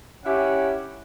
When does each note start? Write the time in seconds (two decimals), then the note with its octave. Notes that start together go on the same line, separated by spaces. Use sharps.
0.25 C#4 E4 G4 F#5